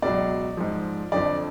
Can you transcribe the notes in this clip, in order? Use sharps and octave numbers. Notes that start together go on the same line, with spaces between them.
C#2 B2 F#3 D5
G#2 F3
F2 D3 F3 D5